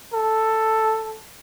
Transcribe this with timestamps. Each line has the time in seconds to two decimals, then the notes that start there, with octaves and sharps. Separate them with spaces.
0.13 A4